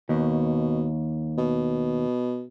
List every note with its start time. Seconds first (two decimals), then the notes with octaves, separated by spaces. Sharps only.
0.09 D#2 B2
1.38 B2